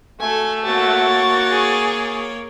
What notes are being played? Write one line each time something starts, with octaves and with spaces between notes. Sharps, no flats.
A3 F#4 A4 G#5
A#3 F#4 C#5 C#6 A6
G#4